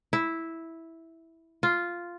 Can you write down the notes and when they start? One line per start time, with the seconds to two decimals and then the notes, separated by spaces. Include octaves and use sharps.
0.13 E4
1.63 F4